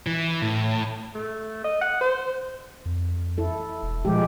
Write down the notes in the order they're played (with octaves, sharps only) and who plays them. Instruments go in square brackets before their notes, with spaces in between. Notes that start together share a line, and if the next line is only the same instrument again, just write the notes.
[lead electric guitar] E3
A2
[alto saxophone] A3
D#5
F#5
C5
[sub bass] F2
[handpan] E4 A4
[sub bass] E1
[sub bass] A#2 [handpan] F3 G#3 G4